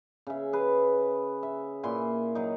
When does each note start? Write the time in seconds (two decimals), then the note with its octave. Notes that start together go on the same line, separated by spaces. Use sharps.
0.27 C#3 E5
0.53 G#4 B4
1.43 E5
1.83 A#2 E4 G#5 C6
2.35 F#3 D#4